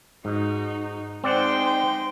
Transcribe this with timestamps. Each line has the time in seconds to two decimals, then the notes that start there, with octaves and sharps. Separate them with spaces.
0.25 G#2 D#4 F#4
1.24 G#3 C4 D#4 C5 D5 F#5 G5